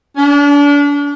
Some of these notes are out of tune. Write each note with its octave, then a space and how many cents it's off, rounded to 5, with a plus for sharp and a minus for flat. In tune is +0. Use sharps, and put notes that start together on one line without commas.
D4 -35